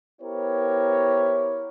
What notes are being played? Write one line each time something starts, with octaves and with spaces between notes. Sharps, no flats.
B3 E4 G4 A#4 C5 C#5